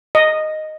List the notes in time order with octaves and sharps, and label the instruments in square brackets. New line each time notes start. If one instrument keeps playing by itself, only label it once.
[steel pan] D#5